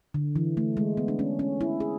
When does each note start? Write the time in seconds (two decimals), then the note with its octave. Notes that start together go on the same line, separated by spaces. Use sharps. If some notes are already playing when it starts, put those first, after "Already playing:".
0.14 D3
0.36 E3
0.57 A3
0.77 G#3
0.97 B3
1.08 D4
1.19 C#4
1.39 C#4
1.61 E4
1.80 G#4